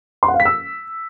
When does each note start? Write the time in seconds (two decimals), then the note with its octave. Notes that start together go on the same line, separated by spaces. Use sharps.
0.23 C6
0.28 F#5
0.34 F5
0.40 B6
0.45 E6